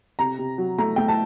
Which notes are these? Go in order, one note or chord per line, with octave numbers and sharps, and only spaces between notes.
C3 A#5
C3
F#3
A3 A#5
A3 G5
A5